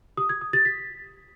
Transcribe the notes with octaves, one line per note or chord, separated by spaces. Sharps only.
D#6
G#6
D#6
A6
B6